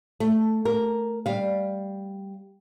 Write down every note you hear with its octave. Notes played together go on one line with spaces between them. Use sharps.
A3
A#4
G3 F5